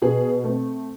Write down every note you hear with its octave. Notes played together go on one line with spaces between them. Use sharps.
B2 G#4
A3 C4